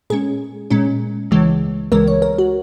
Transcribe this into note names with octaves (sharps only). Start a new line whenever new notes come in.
A#2 G#3 C#4 G#4
A#2 G#3 C#4
C#2 C#3 E3 G#3
C#2 C#3 E3 G#3 A#4
C#5
A#4
F#4